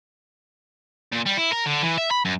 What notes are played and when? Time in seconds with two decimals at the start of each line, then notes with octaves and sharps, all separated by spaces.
1.12 A#2
1.26 G3
1.37 E4
1.52 A#4
1.66 D3
1.83 E3
1.98 E5
2.11 B5
2.25 F#2